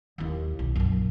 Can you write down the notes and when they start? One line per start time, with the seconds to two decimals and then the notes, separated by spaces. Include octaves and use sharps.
0.18 D#2 E4
0.59 B1
0.75 A#1 F#2